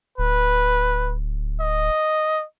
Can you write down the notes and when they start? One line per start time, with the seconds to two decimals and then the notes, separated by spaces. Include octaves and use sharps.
0.18 D1 B4
1.61 D#5